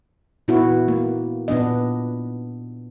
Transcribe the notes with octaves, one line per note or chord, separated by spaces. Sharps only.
A#2 B3 E4 F#4
A#3
A#2 B3 D4 D#5